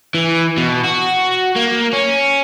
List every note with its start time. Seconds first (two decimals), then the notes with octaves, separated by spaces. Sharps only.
0.14 E3
0.57 B2
0.84 F#4
1.56 A#3
1.93 C#4